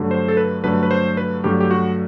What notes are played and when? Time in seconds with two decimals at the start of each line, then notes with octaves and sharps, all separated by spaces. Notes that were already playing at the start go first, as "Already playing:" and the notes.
Already playing: G2 D3 F#3 A3
0.11 C5
0.28 A4
0.37 B4
0.64 G2 D3 F#3 A3 B4
0.83 B4
0.91 C5
1.17 B4
1.44 G2 D3 F#3 A3 G4
1.60 G4
1.71 F#4